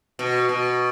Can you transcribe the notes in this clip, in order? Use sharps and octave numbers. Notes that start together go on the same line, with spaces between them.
B2
B2